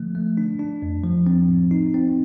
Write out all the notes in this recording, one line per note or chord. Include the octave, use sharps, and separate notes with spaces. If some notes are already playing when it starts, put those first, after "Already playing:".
Already playing: D3 F3 A3
A3
D4
D4
F2
F3
C4
A2
D#4
C4